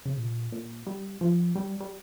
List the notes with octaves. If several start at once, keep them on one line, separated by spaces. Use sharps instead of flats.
C#3
A#2
A#2
G3
F3
G3
G3